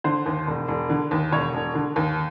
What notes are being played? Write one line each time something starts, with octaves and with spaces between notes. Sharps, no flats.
D3 C5
D#2
E1
E1
D3
D#2
E1 C#5
E1
D3
D#2